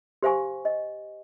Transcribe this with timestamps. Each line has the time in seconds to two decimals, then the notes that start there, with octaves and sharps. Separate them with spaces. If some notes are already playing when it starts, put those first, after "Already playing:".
0.23 G4 C5 F5 G#5 C#6
0.65 D#5